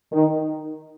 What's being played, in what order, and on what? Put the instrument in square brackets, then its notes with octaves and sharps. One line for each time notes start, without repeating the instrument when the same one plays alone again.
[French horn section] D#3